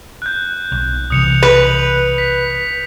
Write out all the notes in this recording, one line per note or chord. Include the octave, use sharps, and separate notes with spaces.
F#6 G6
B1
B1 C3 E3 D#6 C#7 F7
B4
B6